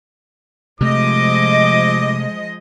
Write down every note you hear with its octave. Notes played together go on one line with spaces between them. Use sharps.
C3 F3 G#3 A3 D#5 D6